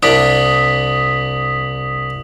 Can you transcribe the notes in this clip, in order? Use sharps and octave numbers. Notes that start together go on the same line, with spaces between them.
C2 D4 D#6 B6 F#7